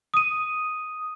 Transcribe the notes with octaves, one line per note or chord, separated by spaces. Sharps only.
D#6 D#7